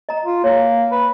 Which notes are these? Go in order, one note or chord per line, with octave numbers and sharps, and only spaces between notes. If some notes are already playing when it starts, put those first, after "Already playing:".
D#5 A#5
F4
A#3 C#5
B4